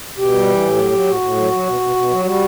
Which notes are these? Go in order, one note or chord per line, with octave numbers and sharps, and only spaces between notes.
B2 G4
G3
E3
A2
F#3
F#3
A2 F#4
A2
F#3
F#3
B2
B2
B2
F#3
G3 F#4